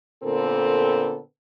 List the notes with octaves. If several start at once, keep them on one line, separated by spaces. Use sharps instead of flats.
A#2 D3 B3 C4 A4 A#4